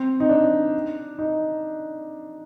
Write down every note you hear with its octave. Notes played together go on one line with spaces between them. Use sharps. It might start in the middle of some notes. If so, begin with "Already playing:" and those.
Already playing: C4
D#4
D4
D#4